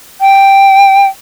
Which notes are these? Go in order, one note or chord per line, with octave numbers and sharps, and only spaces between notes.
G5